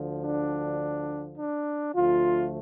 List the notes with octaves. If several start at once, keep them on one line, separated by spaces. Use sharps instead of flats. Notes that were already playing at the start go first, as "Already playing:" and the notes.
Already playing: D2 D3 F3
D4
D4
D2 D3 F3 A3 F4